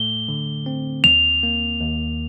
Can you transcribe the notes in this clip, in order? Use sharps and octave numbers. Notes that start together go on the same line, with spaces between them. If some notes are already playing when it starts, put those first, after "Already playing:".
Already playing: A2 A3 G7
D3
C4
D#2 F7
A#3
D#2